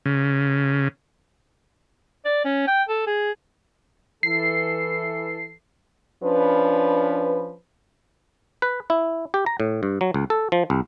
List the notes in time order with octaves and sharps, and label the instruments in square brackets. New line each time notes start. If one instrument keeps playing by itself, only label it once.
[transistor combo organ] C#3
[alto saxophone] D5
C#4
G5
A4
G#4
[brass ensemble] E3 A4 [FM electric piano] C7
[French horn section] F3 C#4 D4 B4
[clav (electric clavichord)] B4
E4
G4
A#5
A2
G2
F#3
C#2
A4
F3
C2